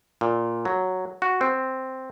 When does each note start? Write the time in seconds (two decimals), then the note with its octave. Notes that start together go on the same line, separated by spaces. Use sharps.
0.21 A#2
0.65 F#3
1.22 F#4
1.41 C4